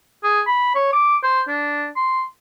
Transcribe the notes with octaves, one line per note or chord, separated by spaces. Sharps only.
G#4
B5
C#5
D6
C5
D4
C6